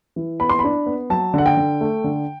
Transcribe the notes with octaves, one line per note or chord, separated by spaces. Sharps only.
E3
B3 B5
C6
D4 B5
B3
F#3 A5
D3 F#5
G5
D3
A3
D3